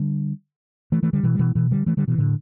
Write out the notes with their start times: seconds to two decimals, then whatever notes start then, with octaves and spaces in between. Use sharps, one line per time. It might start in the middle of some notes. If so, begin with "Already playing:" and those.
Already playing: D3 G3
0.92 E3 A3
1.03 E3 A3
1.13 D3 G3
1.23 B2 E3
1.35 G3
1.39 B2 E3
1.55 B2 E3
1.71 D3 G3
1.86 E3 A3
1.97 D3 G3
2.08 B2 E3
2.18 A2 D3